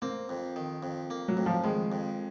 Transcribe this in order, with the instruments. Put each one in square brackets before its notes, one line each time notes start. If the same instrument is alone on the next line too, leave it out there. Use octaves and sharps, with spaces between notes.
[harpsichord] A#3 [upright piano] C4
[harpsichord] F2
D#3
F2
A#3
[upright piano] F#3
[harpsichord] F2
[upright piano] F3
[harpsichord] D#3 [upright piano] G#3
[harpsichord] F2